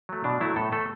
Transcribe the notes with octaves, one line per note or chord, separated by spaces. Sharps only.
F#3 A3
B2 D4
F#3 A3 E4
A2 A4
A3 A4